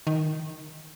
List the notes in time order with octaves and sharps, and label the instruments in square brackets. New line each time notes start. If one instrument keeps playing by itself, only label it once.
[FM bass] D#3